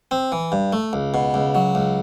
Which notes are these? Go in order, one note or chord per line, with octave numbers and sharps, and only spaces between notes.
C4
E3
G2
A3
C#2
B2
C#2
F#3
C#2